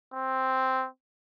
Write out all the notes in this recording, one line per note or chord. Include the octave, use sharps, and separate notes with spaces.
C4